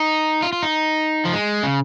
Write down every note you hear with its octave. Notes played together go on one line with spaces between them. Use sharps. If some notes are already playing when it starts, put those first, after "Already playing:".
Already playing: D#4
F4
F4
D#4
F3
G#3
C#3